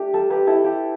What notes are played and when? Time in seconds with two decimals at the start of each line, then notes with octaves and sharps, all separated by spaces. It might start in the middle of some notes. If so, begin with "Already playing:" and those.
Already playing: A3 D4 G4
0.13 G3 A4
0.30 G4 B4
0.47 E4 A4
0.64 G4